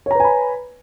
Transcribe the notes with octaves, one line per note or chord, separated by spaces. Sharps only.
B4 C#5 G#5 A#5 B5